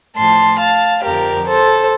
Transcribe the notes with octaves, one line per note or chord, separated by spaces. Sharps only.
A2 F3 A5 C6
F5 A5
F2 D3 F3 G4 A#4
A4 C5